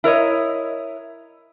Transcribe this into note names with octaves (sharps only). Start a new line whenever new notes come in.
E4 A#4 C#5 D#5